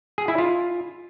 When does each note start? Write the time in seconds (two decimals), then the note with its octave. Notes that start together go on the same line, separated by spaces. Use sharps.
0.18 G#4
0.28 E4
0.38 F4